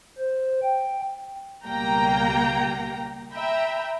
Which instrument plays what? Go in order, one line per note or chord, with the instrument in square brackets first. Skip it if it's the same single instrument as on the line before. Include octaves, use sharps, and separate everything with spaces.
[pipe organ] C5
G5
[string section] C#2 B2 G3 A#3 G5 A#5
E5 G5 A#5 B5 E6